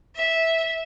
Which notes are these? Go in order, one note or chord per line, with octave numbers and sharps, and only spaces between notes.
E5